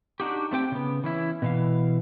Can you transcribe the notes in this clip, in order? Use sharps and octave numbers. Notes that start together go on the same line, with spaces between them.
D4 D#4 F#4 G4
A3 C4 G4 G5
C#3 B3
E3 C#4 E4
B2 E3 F5